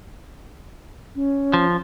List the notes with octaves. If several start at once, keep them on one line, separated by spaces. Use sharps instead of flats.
C#4
F3